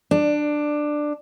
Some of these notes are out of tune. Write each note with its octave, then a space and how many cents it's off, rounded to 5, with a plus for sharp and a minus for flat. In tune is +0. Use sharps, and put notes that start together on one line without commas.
D4 +15